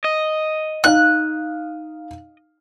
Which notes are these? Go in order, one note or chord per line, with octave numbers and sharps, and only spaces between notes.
D#5
D#4 F5 F#6